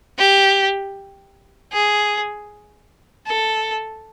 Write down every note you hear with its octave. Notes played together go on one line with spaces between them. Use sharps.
G4
G#4
A4